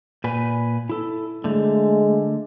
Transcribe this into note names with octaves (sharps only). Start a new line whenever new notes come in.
A#2 B4 G#5
E4 A4
D3 G#3 A3